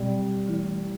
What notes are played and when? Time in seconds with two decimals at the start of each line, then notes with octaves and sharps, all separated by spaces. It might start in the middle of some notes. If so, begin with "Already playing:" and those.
Already playing: B2 F#3 G3 C4
0.48 E3 A3 E4